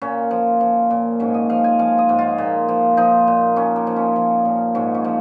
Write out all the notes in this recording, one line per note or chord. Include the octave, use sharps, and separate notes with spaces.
A#2 C#4
F3
F3
A#2
G#2 C#4
D#5
F3 F5
G#5
F3 F5
D#5
G#2
F4
A#2
F3
F3 D#4
A#2
A#2 C#4
A#3
F3
C#4
F3
A#2
G#2 C#4
C#4
F3